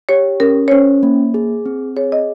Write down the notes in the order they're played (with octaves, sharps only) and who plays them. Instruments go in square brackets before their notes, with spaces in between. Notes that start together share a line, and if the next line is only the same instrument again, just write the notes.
[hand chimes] G4 [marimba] C#5
[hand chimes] C#4 [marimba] A#4
[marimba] C#5
[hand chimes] C#4 [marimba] C5
[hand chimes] A#3
G#4
C4
[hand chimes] G#4 [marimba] C#5
[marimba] D#5